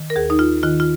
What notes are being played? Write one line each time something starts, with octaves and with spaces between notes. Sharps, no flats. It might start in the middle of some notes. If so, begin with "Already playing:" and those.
Already playing: D#3
A#4
D#2 G#4
D#4
F4
D#3 F4
F4